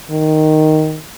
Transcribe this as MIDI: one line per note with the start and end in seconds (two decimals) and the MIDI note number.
0.11 0.99 51